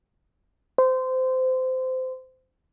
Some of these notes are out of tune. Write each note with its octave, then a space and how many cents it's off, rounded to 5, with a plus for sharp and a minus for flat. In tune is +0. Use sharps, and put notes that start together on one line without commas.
C5 -20